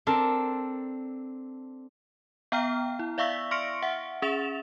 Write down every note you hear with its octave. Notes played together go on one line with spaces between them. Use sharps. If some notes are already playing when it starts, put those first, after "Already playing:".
C4 D4 A4 A#4
B3 F5 G5 A#5 F6
E4
D5 E5 F5 C#6 E6 B6
C6 C#6 F6 A#6 C#7 D7
E5 F#5
C#4 G#4 E5 A6 E7 F7